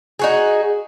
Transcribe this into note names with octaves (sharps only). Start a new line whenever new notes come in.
D#4 F#4 G#4